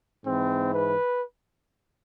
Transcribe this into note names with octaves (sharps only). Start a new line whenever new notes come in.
G#2 E3 C4
B4